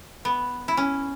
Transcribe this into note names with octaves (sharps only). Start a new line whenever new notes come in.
B3
E4
C#4